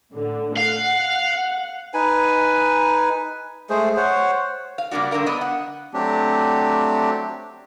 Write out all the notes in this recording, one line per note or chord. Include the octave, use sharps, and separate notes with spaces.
A2 D3
F5 F#5
D#4 B4 G#5
G#3 A3 G#4 C5
C5 C#5 F#5
F5
C#3 G3 A#3 D4 F#4
G2 D3 D4 A#4 F5
B3 D4 D#5
F#5
F#3 A3 C4 D4 G4